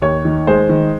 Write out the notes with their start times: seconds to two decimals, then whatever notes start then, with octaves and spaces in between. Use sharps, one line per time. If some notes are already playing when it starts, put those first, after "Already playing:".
0.02 D#2 C#5
0.25 D#3
0.47 G#3 C5
0.69 D#3